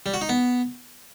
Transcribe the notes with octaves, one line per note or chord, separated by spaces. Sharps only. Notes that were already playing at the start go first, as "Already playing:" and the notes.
G3
F#4
D#4
B3